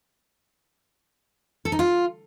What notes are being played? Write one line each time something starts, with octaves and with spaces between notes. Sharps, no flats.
A4
D#4
F4